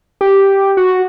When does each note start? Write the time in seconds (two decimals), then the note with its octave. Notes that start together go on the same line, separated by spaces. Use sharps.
0.21 G4
0.77 F#4